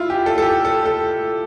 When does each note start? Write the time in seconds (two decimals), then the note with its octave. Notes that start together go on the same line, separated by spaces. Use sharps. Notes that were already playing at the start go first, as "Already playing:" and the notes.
Already playing: E4 F4
0.10 G4
0.26 A4
0.38 A4
0.42 G4
0.65 A4
0.85 A4